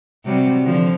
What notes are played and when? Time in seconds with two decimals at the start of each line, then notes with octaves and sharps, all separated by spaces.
0.25 C3 F#3 G3
0.64 D3 F3